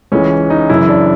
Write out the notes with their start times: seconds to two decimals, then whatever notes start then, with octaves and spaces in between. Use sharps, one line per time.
0.12 C#2 C#3 E3 C#4
0.50 D#4
0.70 F#2 C#3 E3 E4
0.89 D4